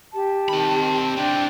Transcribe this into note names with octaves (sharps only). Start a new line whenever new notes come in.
G4 A5
D#3 C4 B5
C4 D4 E4 G5